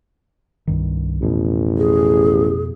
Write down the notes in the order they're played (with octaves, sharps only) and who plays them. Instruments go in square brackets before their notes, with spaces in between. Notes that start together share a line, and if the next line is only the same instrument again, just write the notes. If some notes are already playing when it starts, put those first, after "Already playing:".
[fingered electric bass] C2 G2 D#3
[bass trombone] A1 [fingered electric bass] F2 B2
[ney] G#4